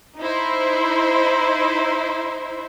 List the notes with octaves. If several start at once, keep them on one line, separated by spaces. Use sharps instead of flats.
D#4 E4 C5